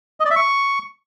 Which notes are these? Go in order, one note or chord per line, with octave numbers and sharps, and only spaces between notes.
D#5
D5
E5
C#6